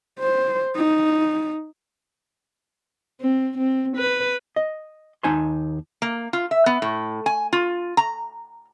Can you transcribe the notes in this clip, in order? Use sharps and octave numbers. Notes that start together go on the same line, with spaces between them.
C5
D#4
C4
C4
B4
D#5
D#2 D#4 G#5 A5 C6
A#3
F4
E5
B3
A2
G#5
F4
A#5